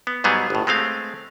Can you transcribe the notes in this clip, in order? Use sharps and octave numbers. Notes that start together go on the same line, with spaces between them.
B3
G#2 F#3 G3 B3 G#4
G1 A2
G#3 A3 C4 F5